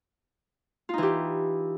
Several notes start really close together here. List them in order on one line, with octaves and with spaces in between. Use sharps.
F4 D#4 E3 G4